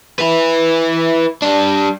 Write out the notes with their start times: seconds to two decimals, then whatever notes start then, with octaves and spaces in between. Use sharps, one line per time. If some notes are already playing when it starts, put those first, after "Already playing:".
0.19 E4 B4
1.42 G3 D4